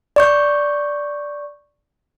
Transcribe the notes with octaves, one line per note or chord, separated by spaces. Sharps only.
D5 C#6 G6